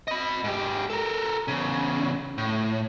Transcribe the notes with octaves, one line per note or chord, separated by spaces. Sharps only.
D#5 B5
G#2 G4
A4 A#4
E2 C#3
A2